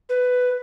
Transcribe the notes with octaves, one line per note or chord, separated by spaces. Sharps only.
B4